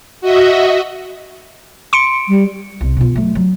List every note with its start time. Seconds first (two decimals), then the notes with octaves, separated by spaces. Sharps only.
0.21 F#4 D#5 E5
1.93 C6 C#7 D7
2.29 G3
2.81 C2
2.97 B2 F4
3.16 F#3 A3
3.35 F#3